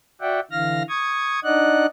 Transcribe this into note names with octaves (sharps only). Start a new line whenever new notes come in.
F#4 D5 E5 F#5 G5
D3 E3 F5 F6 A#6
C#6 D#6 G#6
D4 D#4 D5 D#5 F#5 F#6